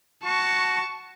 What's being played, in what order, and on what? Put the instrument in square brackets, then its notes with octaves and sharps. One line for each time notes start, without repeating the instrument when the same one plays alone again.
[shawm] F#4 [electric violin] A5 C#6